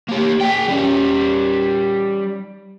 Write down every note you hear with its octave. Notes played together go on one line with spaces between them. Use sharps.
A#3 G4
G#4 G5
G3 C#4